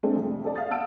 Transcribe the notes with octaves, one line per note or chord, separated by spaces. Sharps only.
G#3 A3 C4 D4 G#4 A4
C2 F2 A3
G#4 A4 D5 A5
E5 F5 D#6 A6
F5 F#5 A5 E6 D7